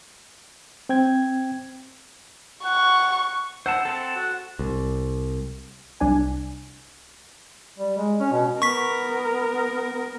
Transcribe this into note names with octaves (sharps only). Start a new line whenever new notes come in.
C4 G5 G#6
F#5 C#6
C5 E5 F#5 A5
C4 A4 A5
F#4
C2
C2 D4 G#5
G3
G#3
C#4
B2
B3 A#4 C#6 B6